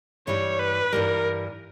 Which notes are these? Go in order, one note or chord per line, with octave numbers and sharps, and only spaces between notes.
G2 E3 G3 C#5
B4
G2 E3 G3 A#4